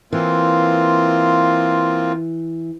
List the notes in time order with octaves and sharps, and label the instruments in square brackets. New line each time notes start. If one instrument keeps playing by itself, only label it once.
[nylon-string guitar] E3 [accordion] A#3 C4 F4